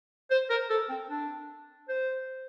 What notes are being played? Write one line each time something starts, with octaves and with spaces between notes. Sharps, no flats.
C5
A#4
A4
C4
D4
C5